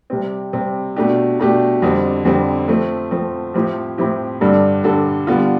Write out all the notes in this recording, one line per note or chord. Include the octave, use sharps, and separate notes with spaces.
C3 G3 C4
C3 G3 C4
B2 A3 D4 G4
B2 A3 D4 G4
F2 D3 G3 C4
F2 D3 G3 C4
F3 A3 C4
F3 A3 C4
A2 F3 C4 E4 G4
A2 F3 C4 E4 G4
G2 D3 G3 D4 A4
G2 D3 G3 D4 A4
D3 G3 B3 F4